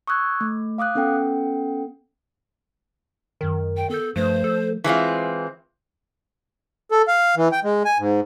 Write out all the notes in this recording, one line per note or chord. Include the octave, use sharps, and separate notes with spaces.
C#6 D#6 E6 F#6 G#6
A3
F5 D6 D#6 F#6
B3 C#4 A4 F#5 G5
F#2 D#3 A#4
G5
B3 A4 G6
G2 F3 A3 C5
A4
E3 G#3 C4 F4
A4
F5
E3
G5
G#3
G#5
G#2